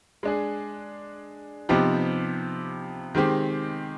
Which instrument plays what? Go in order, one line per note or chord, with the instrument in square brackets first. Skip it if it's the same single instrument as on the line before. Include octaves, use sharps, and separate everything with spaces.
[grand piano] G#3 D4 G#4
C3 F3 B3 D#4 G4
D#3 G#3 C4 G4